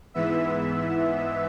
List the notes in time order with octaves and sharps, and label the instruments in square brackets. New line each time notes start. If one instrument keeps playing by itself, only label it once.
[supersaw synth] G#2 E3 B3 E5